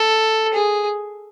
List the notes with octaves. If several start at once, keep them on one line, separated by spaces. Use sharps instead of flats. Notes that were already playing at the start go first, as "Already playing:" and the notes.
Already playing: A4
G#4